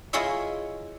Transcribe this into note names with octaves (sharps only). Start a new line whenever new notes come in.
E4 F4 G#4 C#5 D#5 E5